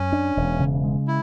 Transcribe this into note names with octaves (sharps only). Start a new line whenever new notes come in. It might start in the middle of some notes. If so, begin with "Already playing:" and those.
Already playing: F#2 C#4
D4
E1
C#3
G#3
E4